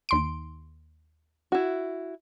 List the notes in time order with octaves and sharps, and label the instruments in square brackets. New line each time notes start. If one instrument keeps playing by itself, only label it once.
[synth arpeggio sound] D#2 C6 D7
[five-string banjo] E4 F#4